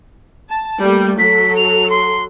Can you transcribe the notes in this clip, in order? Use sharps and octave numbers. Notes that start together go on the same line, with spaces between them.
A5
G3 A3 A#3
F#3 A4 B6
F7
C6